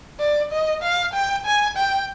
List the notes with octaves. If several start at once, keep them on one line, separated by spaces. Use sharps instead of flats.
D5
D#5
F5
G5
G#5
G5